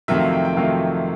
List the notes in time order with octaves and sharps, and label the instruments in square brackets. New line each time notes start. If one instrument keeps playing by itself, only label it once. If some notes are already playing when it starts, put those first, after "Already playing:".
[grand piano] F2 C3 D#3 F#3 A3 E5
F5
G5
G5
F2 C3 D#3 F#3 A3 F5